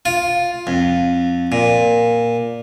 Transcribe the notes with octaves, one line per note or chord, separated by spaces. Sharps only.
F4
F2
A#2